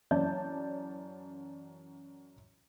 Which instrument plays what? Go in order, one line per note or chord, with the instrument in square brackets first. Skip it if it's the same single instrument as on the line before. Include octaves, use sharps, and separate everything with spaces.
[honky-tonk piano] F#2 E3 C#4 D5 A5 G6